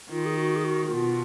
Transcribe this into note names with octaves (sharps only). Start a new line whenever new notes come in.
D#3 F4
G#4
F#4
G#4
F#4
F#4
B2 F4